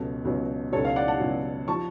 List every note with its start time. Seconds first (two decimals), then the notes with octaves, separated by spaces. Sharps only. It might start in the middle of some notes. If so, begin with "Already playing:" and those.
Already playing: C#2 B2 F#3 A4
0.25 C#2 B2 F#3
0.72 C#2 B2 F#3 A4 C#5
0.85 C#5 F5
0.96 D5 F#5
1.08 F#5 A5
1.20 C#2 B2 F#3
1.68 F3 A5 C#6